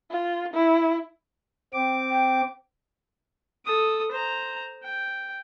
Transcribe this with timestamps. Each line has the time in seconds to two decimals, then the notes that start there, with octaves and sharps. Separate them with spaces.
0.11 F4
0.54 E4
1.74 C4 G5 D6
2.10 G5
3.65 A4 D#6
4.11 C5 A#5
4.83 G5